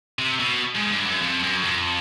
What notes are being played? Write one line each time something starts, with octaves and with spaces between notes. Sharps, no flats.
C3
B2
G#2
G2
F#2
F2
F#2
F2